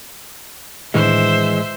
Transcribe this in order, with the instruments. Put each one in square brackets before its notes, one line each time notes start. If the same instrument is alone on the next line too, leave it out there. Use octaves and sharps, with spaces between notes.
[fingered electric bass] A2 D#3 D4 [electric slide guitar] E3 G#3 [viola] C5 E5